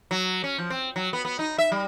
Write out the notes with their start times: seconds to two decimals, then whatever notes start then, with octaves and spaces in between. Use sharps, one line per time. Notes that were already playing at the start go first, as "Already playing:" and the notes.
0.11 F#3
0.44 C#4
0.58 F3
0.70 C4
0.96 F#3
1.13 B3
1.25 B3
1.39 D#4
1.58 E5
1.72 G3